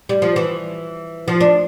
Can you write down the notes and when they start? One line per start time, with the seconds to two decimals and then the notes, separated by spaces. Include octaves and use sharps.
0.09 G3
0.22 F3
0.36 E3
1.28 F3
1.41 D4